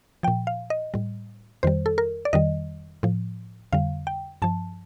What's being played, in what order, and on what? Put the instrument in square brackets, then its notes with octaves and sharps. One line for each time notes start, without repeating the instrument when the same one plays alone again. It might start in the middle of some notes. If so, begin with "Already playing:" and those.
[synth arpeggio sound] A#2 F3 G5
F5
D#5
A2 G3
F2 D#3 G3 C5
A4
A#4
D5
F2 D#3 G3 D#5
A2 F3
F2 D3 G3 F5
G5
G2 F3 A5